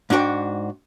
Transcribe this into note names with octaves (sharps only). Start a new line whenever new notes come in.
G#2 D4 F#4 G5